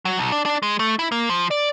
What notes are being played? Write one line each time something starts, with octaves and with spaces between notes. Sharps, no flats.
F#3
B1
D4
D4
G#3
A3
E4
A#3
F3
D5